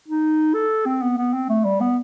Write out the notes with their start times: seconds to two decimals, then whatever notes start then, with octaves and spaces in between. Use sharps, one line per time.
0.08 D#4
0.54 A4
0.86 C4
1.02 B3
1.17 B3
1.33 C4
1.49 A3
1.65 G3
1.80 B3